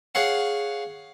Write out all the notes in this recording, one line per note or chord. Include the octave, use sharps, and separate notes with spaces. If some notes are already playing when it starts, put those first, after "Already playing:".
G#4 C#5 F5 F#5